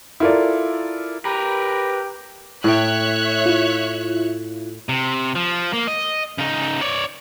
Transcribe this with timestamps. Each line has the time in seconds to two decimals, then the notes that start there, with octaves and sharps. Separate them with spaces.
0.20 E4 F4 A4 A#4 D5
1.25 G4 A#4 B4
2.64 A2 C#5 E5 G5 F#6
3.46 E4 F4
4.89 C3
5.35 F3
5.73 A#3
5.88 D#5
6.38 C#3 D#4
6.81 C#5 D5